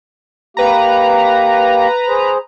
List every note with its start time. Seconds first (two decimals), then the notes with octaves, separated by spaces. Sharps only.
0.57 A#3 G4 B4 A#5
2.08 G#4 C5